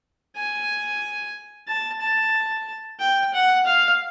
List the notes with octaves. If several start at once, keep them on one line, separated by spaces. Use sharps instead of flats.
G#5
A5
A5
G5
F#5
F5